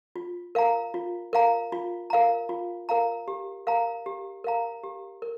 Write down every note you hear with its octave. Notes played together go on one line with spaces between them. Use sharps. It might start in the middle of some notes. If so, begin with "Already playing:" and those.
F4
A#4 F5 A#5
F4
A#4 F5 A#5
F4
A#4 F5 A#5
F4
A#4 F5 A#5
G4
A#4 F5 A#5
G4
A#4 F5 A#5
G4
A#4